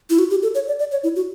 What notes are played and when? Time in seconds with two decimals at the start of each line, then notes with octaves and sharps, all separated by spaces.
0.10 E4
0.18 F#4
0.30 G4
0.42 A4
0.55 C#5
0.67 D5
0.79 D5
0.91 C#5
1.03 E4
1.16 F#4